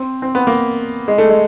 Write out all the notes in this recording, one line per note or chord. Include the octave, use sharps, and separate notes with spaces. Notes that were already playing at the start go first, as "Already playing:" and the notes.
Already playing: C4
C4
B3
A#3
G#3
A3
G#3